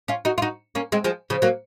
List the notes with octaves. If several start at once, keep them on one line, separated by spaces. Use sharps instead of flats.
C#4 F4
D#4 F#4
F4
D#4 F#4
A#3 C#4
G#3 C4
F3 G#3
C#3 F3
F#3 A#3